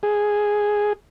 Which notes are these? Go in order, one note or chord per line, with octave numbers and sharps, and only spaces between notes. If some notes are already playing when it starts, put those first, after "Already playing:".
G#4